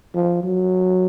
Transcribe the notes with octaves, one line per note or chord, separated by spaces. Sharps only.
F3
F#3